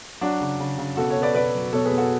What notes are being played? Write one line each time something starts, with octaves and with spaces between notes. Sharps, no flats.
F#3 D4 F#4
C#3
C#3
C#3
B2 F#4 A4
A4 C#5
B2
B4 D5
B2 B4 D5
F#3
B2 A4 C#5
G#4 B4
B2
F#4 A4